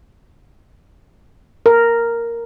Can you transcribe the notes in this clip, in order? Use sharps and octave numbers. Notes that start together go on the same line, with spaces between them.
A#4